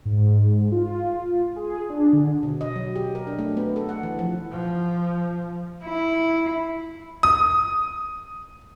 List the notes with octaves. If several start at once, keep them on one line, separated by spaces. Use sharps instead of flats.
G#2
F4
G#4
D4
D3
B2
D#5
F#3
G4
A#4
D4
A3
B3
A4
F#5
E3
F3
F3
E4
D#6